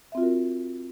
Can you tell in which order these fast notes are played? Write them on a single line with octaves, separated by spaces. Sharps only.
E5 C4 F4 F#4 A#4